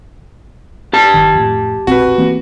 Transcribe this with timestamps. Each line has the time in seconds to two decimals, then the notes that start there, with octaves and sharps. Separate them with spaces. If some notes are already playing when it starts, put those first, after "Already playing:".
0.93 G4 A5
1.14 G1 D#3
1.35 F2 A2
1.87 E1 A#1 C4 F#4 B4
2.18 E3 A#3 C4